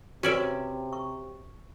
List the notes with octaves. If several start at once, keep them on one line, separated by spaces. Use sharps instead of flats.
C3 C#4 F#4 B4 D5 E5
C#6